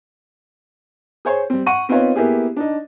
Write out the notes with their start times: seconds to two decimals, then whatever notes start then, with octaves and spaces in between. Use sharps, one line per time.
1.25 G#4 C5 C#5
1.50 G3 C4
1.67 F#5 C#6 D#7
1.89 B3 C4 D#4 F4 B4 C#5
2.16 A#3 B3 E4 G4 G#4
2.57 D4 D#4